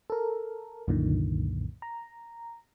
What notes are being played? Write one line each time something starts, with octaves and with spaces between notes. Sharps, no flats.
A4 A#4
C2 F#2 A#2 D3 D#3
A#5